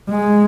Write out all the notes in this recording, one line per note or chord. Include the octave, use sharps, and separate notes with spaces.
G#3